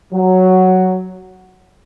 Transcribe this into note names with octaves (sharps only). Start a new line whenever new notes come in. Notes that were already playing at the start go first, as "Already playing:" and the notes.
F#3